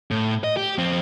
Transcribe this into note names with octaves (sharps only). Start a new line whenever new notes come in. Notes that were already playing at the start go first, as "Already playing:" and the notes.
A2
D#5
G4
F2 C4